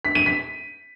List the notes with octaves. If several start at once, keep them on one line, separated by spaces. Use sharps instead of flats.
B6
D#7
B6